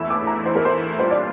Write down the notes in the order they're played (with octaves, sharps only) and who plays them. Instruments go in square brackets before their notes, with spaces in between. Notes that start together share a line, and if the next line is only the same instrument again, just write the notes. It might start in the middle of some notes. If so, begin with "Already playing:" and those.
Already playing: [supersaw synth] E2 E3 A3 E4 [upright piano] E6
[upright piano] D6
A#5
C5
A#4
C5
[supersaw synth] A#2 G3 D4 F4 [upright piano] C5
[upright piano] D5